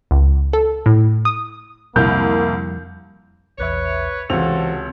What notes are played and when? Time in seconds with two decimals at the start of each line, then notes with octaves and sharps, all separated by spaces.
0.11 C#2
0.53 A4
0.86 A2
1.25 D#6
1.96 C2 F2 D3 G3 A#3 G6
3.58 A#1 E2 B4 C#5 E5
4.30 C#2 C3 E3 F#4 A4 C5 F7